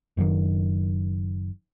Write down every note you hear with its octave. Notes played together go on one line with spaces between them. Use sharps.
F#1 F#2 A2 D#3